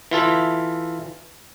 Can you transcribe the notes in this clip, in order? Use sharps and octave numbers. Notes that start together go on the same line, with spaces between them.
E3 F4 A4 E5